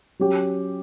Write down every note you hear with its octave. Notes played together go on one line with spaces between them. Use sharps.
F#3 C#4 G4